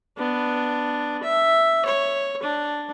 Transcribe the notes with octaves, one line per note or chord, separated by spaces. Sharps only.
B3 D4
E5
C#5
D4